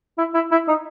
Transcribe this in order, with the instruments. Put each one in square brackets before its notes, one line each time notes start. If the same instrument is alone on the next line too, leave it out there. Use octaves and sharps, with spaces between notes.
[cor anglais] E4
E4
E4
D#4